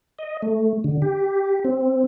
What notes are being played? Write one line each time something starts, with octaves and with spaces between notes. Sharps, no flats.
D#5
A3
D3
G4
C4